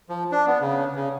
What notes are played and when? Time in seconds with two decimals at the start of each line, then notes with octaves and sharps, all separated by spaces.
0.09 F3
0.32 D4
0.47 B3
0.61 C#3
0.95 C#3